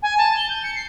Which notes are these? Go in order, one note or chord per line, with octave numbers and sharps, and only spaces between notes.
G#5
A5
G7
G6
C#7
C7